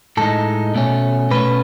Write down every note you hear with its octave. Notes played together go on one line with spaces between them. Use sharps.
A2 G#3 D#4 A4
B2 A3 C#4
B2 A3 C#4 B4